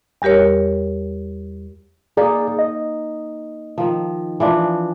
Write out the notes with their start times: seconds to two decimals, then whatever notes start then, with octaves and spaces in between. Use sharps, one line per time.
0.22 E2 G3 G4 A#4 C#5
2.17 A#3 D#4 G#4 D5
2.59 D#5
3.78 D#3 F3
4.40 E3 F3 D4